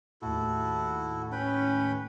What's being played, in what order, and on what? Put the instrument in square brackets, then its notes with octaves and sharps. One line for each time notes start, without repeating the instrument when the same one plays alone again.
[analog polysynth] D#2 A2 [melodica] E4 F#4 A4
[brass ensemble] C#4 [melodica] B4 G5 B5